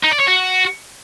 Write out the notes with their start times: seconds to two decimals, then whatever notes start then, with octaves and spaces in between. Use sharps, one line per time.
0.03 D#4
0.11 D5
0.19 C#5
0.27 F#4